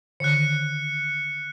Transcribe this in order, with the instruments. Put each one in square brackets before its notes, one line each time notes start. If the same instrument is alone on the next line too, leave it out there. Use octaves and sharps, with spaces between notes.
[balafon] D3 D#3 [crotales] F#6 C#7